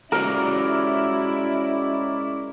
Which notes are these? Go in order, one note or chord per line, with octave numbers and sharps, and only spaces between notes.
G#3 C#4 E4 F#4 G4 A#4 C#5 D5